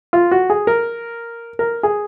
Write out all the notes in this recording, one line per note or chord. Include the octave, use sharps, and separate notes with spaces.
F4
F#4
G#4
A#4
A#4
G#4